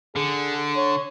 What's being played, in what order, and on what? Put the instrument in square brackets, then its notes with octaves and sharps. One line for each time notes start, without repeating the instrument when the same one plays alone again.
[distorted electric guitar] D3 [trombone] G#4
[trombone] C#5